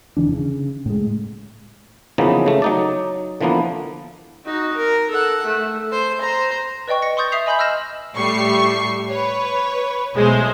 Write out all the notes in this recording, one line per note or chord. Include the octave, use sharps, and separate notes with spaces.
F1 D3 E3 D4
C#3
A2 G#3
C#3 E3 F3 A#3 B3 D#4
C#3 A3
F#3 D#4 D5
D3 E3 F3 A#3 B3
D#4 F#4
A#4
A4 F#5
A3
A4 C5
C5 A#5
B4 D5 D#5 G5 C#6
A#6 C#7
C6 C#6 D#6 G6 A6
E5 D#6 B6 C7 F7
D#5 G#5 B5 C6 G6 F#7
E6 F6 G6 A#6 E7
A2 G3 A3 C#6 C7
B4 C#5
B1 G#3 A3 C5